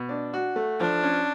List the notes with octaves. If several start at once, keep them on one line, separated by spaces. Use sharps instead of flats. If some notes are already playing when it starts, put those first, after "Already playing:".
Already playing: B2
D4
F#4
A3
F3 D4
C#4